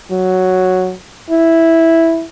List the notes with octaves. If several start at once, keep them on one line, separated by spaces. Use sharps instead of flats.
F#3
E4